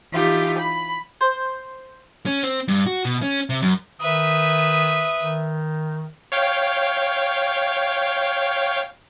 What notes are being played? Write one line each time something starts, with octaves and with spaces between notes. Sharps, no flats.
E3 D#4 F4 G4
B5
C5
C#4
C4
G2
F#4
B2
C#4
C3
F#2
D#3 B4 E5 D#6
D#3
C#5 F5 G5